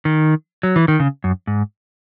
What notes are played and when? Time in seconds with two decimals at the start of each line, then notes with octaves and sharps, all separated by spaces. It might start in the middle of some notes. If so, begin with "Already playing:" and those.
0.05 D#3
0.63 F#3
0.76 E3
0.88 D#3
1.00 C#3
1.24 F#2
1.47 G#2